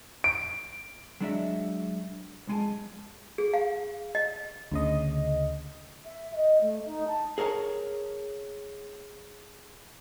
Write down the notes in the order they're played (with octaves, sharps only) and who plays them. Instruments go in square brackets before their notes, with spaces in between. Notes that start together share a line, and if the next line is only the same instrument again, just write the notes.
[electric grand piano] D7
[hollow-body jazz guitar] F#3 G#3 D4 E4 F#4 E5
B1 F2 G#3 G#5 A5
[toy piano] G#4
F5
D#5
[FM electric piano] D2 C#3 D#5
[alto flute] E5
D#5
A3
D#4
A5
[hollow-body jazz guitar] G#4 A#4 C#5 F#5 A5